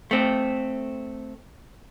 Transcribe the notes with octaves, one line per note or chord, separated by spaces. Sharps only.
A3 C4